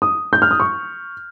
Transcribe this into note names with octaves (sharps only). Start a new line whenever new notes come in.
D#6
G6
F6
D#6
C#6